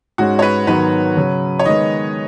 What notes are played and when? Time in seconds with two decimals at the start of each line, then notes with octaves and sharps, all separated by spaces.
0.18 G#2 G#3 C#4 F#4
0.39 C#5
0.42 B4
0.67 G#2 D#3 F#3 B3 B4
1.17 C#3 F#3 C#4
1.59 C#5
1.66 D#3 G#3 B3 D#5